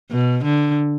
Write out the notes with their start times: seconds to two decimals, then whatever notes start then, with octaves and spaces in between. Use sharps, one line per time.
0.11 B2
0.44 D3